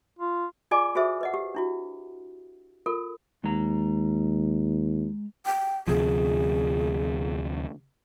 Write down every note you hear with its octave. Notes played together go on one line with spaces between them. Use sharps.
F4
F4 G#4 D5 D#5 G#5 D6
F#4 G#4 A4 C5 E5
B4 D#5 F#5
G4
D4 E4 F#4
F4 A4 A#4
D#2 G#3 A#5
G5
D2 C3 F3 G#4